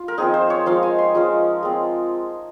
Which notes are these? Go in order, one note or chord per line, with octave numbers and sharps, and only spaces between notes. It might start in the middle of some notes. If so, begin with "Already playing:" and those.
Already playing: F4
A#4
F3 C4 D#4 G#4
C5
C#5
F3 G#3 D#4 F5
G#5
C6
F3 G#3 C#4
G#3 C4 F4